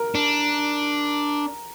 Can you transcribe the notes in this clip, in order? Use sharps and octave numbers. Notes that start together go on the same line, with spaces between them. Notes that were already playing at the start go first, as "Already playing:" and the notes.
Already playing: A#4
D4